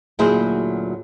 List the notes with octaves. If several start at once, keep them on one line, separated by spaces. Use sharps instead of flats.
D2 A#2 F#3 E4 G#4 C5